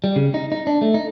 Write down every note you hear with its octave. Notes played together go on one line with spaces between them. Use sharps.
G3
C#3
D#4
D#4
D4
A3
D#4